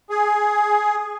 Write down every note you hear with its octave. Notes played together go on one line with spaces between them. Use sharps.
G#4